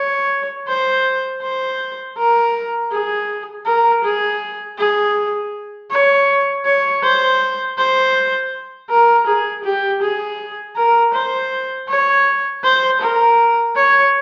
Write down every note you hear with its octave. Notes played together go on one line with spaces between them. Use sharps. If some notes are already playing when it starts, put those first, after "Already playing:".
Already playing: C#5
C5
C5
A#4
G#4
A#4
G#4
G#4
C#5
C#5
C5
C5
A#4
G#4
G4
G#4
A#4
C5
C#5
C5
A#4
C#5